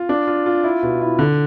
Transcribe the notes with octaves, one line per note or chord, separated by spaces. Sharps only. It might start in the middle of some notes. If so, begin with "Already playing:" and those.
Already playing: F4
D4
F4
F4
E4
B2
E4
D3